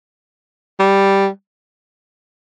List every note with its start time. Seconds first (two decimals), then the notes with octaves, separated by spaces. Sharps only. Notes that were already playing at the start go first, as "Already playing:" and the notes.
0.80 G3